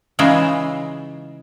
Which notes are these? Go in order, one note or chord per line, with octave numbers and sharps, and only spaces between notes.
C#3 E3 G#3 D#4 F4 E5